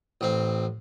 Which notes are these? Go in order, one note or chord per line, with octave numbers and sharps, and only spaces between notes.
A1 C4